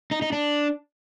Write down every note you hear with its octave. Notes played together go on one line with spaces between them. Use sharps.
D#4
D#4
D4